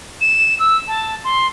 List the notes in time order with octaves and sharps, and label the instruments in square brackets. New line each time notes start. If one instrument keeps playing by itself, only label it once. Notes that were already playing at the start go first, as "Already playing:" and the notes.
[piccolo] E7
E6
A5
C6